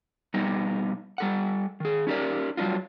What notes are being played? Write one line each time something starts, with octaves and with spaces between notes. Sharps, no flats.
B2 G3 B3 D#4
G3 A4 F#5
D#3 G#4
C#4 D#4 G4 A#4 D5
F#3 G3 D4 D#4 F4